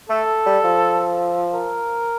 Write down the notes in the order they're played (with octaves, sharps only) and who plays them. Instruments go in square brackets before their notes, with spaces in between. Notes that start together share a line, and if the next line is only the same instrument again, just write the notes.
[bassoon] A3 [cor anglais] A4
[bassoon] G3
F3
[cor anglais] A#4